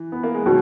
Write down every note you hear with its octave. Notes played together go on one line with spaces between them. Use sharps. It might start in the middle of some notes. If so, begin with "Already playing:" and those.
Already playing: E3
B3
A#3
G#3
B2 D#3 F#3